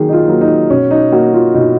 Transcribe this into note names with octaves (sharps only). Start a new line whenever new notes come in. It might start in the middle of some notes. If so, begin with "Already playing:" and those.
Already playing: D#3 F#3 A#3 G#4
D#4
F4
F#3 A#3
D#4
B2 C#4
D#4
A#3 F#4
F4
B2 D#4